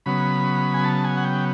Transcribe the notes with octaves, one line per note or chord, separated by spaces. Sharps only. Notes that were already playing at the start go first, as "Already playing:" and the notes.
C#3 F#3 B3 B5
G#5
A5
G#5
F#5
G5